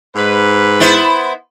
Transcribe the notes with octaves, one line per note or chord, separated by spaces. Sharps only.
G#2 B4
B3 E4 C5